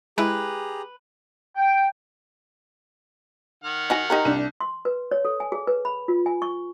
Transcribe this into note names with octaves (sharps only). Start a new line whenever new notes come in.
G#3 E4 G4 G#4 B4 A#5
G5
D#3 F#5 F6
D#4 F#4 G#5
D#4 G4 A#4
C2 D4
C6
B4
C#5
A4
G#5
G#4
B4
B5
F4
G#5
C#6